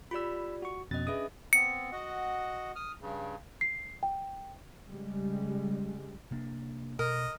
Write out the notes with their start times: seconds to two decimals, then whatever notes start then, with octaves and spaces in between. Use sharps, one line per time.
0.11 F4 G4 D5 B5 E6
0.62 F#4 C#6
0.91 F2 B2 C#4 D#5 A6
1.07 D4 G#4 B4 E5 D#6
1.53 B3 C4 C#7
1.92 F#4 D#5 F#5
2.76 D#6 F6
3.02 G2 C#3
3.61 C7
4.03 G5
4.86 C#3 G3 G#3
6.31 C3 A#3 D4
6.99 B2 A#4 D#5